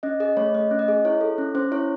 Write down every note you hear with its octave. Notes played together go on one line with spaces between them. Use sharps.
C#4 D#5
G#4 D#5
A3 C#5
A3 D#5
C#4
D#5
G#4
E4 C#5
A4
C#4
C#4 C5
E4 C#5